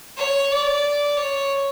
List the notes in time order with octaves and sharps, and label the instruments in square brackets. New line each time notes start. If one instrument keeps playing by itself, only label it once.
[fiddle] C#5
D5
C#5